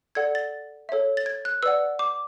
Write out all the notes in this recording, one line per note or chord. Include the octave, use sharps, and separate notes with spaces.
A4 D5 F#5 G#6
A6
A4 C#5 E5
A6
G#6
F#6
B4 D5 F#5 E6
D6